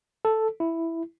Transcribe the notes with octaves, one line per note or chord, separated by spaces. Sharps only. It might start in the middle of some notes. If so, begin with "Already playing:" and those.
A4
E4